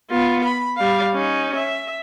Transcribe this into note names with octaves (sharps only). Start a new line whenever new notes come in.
B3 F4
B5
G3 F5
C#4 D#4
E5